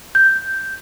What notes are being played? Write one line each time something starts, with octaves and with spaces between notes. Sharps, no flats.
G6